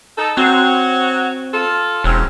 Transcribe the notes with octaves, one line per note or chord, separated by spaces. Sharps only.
D#4 A4
F#3 C4 F#4
F4 A4
E1 F#3 C4 C#4